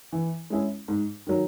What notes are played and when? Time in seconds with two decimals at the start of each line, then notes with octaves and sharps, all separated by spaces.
0.13 E3
0.50 G#3 C#4 E4 G#4
0.88 G#2
1.27 D#3 F#3